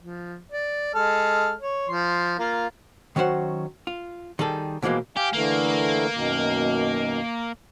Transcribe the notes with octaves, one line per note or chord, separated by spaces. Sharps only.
F3
D5
G#3 A4 F6
C#5
F3 C6
A#3 F4
D#3 F#3 C#4 C5 F#5
F4
D#3 G3 G#4 A4
B2 E3 F3 G#3 A#3
G4 F5 G#5
D3 E3 A3 A#3
F#2 B2 D#3